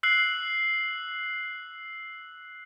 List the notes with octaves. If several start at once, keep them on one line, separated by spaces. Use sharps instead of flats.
E6 F#6 C7 F#7